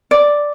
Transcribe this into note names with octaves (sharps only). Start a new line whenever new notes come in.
D5